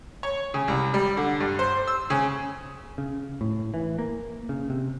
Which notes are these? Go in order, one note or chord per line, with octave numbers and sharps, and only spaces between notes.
C#5
C#3
C2
G3
D3
G2
C5
E6
C#3
C#3
A2
E3
A#3
C#3
C3